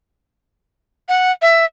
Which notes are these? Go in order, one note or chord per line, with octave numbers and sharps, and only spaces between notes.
F#5
E5